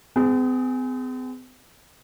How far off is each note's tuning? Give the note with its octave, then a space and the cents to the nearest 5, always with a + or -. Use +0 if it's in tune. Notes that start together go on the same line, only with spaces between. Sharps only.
C4 -45 G#4 +0